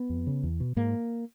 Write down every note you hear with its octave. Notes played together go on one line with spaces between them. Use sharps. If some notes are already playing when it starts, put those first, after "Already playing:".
Already playing: B3
F2
C#3
E2
B2
G#2 A#3